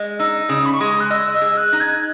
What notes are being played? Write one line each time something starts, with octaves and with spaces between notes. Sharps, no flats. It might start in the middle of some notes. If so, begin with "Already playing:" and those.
Already playing: G#3
D#4 E6
C#3 D#6
B5
C#6
G#3 D#6
F#6
D#5 E6
E6
G#4
F#6
D#4
G#6